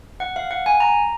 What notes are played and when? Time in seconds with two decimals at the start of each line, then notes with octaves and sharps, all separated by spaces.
0.20 F#5
0.36 F5
0.51 F#5
0.66 G#5
0.80 A#5